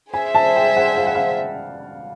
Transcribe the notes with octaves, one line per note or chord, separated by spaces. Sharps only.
G#4 C5 E5 G#5
A5
G5
F#5
F5
F#5
F5